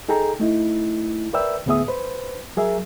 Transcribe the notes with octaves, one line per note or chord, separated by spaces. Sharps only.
D#4 G#4 A4 G5 A#5
A3 D#4 E4
A#4 B4 D5 E5 G5 E6
D2 A2 B3 G#4 E5 D#6
B4 C5
F#3 G#4 A#4 E5